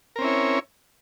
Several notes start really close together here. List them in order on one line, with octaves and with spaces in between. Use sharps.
A#4 C4 C#4 E4 C#5